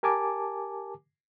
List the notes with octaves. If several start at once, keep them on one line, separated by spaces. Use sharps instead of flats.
G4 A#4 G#5 A5 D6